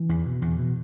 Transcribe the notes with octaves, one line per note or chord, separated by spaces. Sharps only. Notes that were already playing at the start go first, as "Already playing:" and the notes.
Already playing: E3
E2
B2
E2
B2